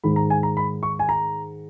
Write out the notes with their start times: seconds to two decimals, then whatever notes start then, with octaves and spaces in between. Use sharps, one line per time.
0.04 G#2 D#3 G#3 B5
0.16 A#5
0.30 G#5
0.43 A#5
0.57 B5
0.83 C#6
0.99 G#5
1.09 A#5